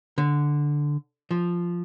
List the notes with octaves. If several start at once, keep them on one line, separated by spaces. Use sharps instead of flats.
D3
F3